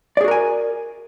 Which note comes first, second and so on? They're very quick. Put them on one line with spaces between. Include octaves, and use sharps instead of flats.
D5 G#4 F#4 A#4 G#5